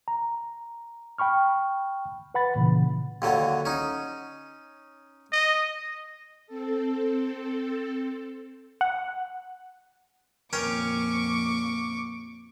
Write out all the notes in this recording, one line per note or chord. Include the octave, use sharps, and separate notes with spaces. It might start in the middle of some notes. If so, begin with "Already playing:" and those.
A#5
G5 B5 C#6 F6
B4 F#5 B5 A6
A#2 C#3 E3
D#2 D3 F#3
C#4 D#4
D#5
C4 A4
F#5
F2 A#2 C#4 A#4 G5 C#6 D6